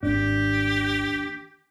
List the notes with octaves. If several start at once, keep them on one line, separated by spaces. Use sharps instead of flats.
G#1 D#2 G#2 D4 G4